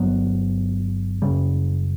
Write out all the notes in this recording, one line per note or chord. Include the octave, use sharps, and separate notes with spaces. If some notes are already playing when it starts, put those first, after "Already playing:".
Already playing: G1 G2 F#3 B3
F#1 F#2 C#3 G3